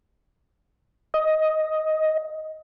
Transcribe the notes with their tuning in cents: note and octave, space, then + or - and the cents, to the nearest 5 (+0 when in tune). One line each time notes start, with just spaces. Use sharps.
D#5 +10